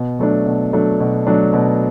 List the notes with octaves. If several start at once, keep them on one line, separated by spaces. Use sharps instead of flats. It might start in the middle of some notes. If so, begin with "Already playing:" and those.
Already playing: B2
F#3 A3 D4
B2
F#3 A3 D4
B2
F#3 A3 D4
B2